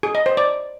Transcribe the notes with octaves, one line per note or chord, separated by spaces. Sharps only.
G#4
D#5
C5
D5